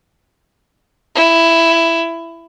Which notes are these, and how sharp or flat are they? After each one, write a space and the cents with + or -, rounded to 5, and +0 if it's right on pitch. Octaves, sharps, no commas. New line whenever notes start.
E4 +10